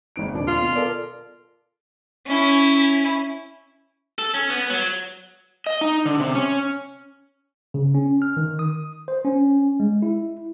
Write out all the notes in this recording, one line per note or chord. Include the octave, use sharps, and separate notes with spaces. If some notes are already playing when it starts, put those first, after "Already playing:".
G#1 D#4 D7
D#1 F2 D4
F4
B2
A4 A#4 D5
C#4 E4
A4
C#4
B3
F#3
D#5
D#4
D3
C3
C#4
C#3
C#4
F6
D#3
D#6
C5
C#4
G#3
E4